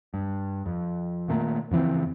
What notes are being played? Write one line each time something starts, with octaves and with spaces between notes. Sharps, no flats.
G2
F2
A#2 D#3 A3 A#3
F2 C#3 E3 C4